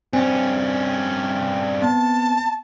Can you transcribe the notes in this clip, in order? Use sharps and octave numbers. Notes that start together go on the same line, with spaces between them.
G2 C4 C#4 G#5
B3 A5